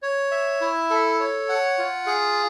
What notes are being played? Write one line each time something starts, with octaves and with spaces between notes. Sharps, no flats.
C#5
E5
E4
A4
C#5
F#5
F4
G#4